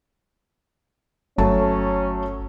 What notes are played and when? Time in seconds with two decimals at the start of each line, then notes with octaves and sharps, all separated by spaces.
1.38 G1 F#3 A3 C#4 A5